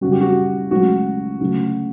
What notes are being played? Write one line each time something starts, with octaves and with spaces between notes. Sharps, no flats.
F#2 C#3 G3 F#4
G4
F#4
C#2 C#3 F#3 A3 F#4
D2 C#3 F#3 A3